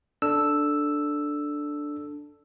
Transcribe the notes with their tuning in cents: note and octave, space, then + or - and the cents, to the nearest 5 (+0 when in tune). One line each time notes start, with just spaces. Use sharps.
D4 +0 A4 +0 E6 +0